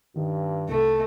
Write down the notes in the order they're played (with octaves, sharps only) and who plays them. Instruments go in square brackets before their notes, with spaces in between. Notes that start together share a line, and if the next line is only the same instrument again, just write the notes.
[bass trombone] G2 [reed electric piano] D#3
[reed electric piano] C2 [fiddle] A3